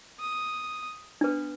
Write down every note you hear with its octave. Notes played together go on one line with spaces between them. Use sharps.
D#6
B3 D4 B4